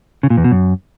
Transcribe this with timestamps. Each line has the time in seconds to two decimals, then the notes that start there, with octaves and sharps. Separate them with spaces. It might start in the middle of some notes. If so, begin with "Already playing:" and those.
0.23 C#3
0.30 A#2
0.37 E2
0.44 B2
0.51 F#2